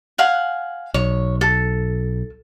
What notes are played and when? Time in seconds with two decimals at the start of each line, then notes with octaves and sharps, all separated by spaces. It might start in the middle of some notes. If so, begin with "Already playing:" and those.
0.18 F5 F#5 G#5
0.94 B1 C#5
1.41 A4